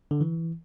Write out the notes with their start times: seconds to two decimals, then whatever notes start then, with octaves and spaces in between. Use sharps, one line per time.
0.11 D3
0.21 E3